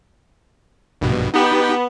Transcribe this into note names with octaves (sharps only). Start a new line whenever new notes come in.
A#1 G2 B2
B3 D#4 G4 G5